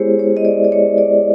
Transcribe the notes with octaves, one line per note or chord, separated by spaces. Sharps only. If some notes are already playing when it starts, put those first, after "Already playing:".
Already playing: G#3 B3 E4 G4 G#4 C5 C#5
C#5
D#5
D5
D5
C#5
D5